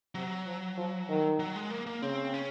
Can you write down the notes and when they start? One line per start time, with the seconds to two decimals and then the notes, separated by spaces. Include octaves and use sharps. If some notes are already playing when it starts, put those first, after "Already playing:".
0.15 C3 F#3
0.46 F3
0.77 F3
1.09 D#3
1.40 F#3
1.56 G#3
1.71 A#3
1.86 A#3
2.02 C#3 C4
2.34 C#4